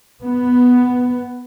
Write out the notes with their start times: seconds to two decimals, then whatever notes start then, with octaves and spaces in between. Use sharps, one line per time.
0.21 B3